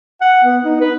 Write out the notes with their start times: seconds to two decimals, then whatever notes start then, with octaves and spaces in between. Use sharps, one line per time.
0.21 F#5
0.44 B3
0.65 D#4
0.81 B4